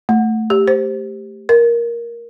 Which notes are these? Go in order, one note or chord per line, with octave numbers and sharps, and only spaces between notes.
A3
G4
C5
A#4